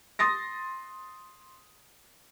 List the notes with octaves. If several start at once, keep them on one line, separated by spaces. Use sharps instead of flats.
C6 D#6 A6 A#6